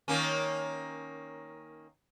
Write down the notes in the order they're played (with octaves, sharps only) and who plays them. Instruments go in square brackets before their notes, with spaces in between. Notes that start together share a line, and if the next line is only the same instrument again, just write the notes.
[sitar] D#3 A#3 C#4